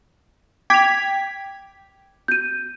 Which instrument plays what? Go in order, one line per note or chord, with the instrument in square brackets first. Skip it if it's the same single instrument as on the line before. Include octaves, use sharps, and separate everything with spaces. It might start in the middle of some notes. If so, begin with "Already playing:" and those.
[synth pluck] G5 G#6 B6 [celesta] D6 F7
[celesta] G6 D#7